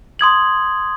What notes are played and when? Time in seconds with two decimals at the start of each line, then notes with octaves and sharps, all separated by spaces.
0.19 C6 D#6 G#6 F#7